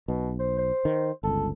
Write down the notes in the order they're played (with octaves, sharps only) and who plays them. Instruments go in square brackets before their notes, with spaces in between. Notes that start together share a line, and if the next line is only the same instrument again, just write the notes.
[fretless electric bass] B1 [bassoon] B2
[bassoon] C5
C5
[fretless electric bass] D#3
[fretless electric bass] G1 C#2 [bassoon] A4